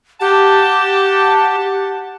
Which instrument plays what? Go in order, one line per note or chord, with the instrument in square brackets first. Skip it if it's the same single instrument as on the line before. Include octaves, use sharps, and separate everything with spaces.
[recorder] G4 [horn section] F#5 A5